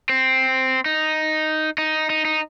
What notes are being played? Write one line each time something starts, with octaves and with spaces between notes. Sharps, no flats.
C4
D#4
D#4
D#4
D#4